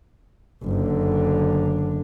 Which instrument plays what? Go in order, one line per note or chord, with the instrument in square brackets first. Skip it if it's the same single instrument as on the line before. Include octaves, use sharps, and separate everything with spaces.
[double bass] F#1 D3